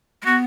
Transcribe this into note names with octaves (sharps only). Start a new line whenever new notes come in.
G#3
B3 F#4